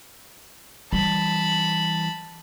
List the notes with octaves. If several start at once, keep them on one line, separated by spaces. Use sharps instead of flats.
E3 G3 A5 B5